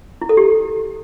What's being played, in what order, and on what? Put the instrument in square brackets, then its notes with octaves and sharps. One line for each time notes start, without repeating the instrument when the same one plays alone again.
[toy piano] E4
A4
G4